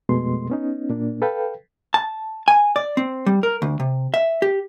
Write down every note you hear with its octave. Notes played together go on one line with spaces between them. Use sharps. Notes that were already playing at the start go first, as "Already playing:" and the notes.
F2 B2 G#3 A3 C6
B3 C#4 D#4
A#2 A#3 D4
A4 B4 F5 G5
A5
G#5
D5
C4
G3
A#4
D2
C3
E5
G4